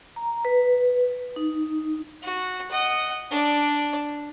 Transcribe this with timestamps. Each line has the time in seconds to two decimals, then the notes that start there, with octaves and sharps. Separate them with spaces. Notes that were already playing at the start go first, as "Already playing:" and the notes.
0.16 A#5
0.45 B4
1.36 D#4
2.23 F#4
2.70 D#5 F#5
3.31 D4 D5